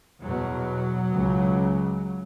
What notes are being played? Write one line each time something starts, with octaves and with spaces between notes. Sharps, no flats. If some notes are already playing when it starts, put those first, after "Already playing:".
E2 B2 F#3
C#2 C#3